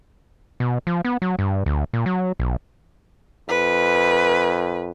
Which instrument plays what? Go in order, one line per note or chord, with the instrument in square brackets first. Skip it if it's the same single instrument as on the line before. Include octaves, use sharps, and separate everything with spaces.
[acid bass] B2
F3
B3
F#3
G2
D2
A#2
F#3
B1
[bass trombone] F2 [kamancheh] B4